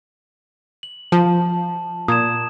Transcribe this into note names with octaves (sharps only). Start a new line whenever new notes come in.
F#7
F3 A5
A#2 D#6 G#6 E7